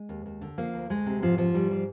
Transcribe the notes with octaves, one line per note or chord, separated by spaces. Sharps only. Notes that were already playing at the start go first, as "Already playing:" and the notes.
Already playing: G#3
D#2
D#2
D3
F3 A#3
D2
D2 G#3
C3
G#2 F3
F3
G#2 G3
F3